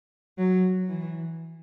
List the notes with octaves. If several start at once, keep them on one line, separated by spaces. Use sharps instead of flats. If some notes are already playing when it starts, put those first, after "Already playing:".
F#3
E3